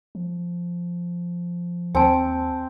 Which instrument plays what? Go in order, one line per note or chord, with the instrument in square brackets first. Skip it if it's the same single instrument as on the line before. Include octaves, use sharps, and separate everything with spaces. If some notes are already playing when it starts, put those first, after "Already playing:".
[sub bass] F3
[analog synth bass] D#2 [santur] C4 [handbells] G#5 A5